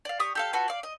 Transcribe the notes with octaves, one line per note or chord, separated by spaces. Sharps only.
D5 F5
G4 C#6 D#6
G4 A4 F5
F4 F#4 A4 B4
D5 F5
D#5